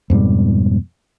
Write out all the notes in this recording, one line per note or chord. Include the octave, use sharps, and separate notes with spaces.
F2 G#2 B2 G3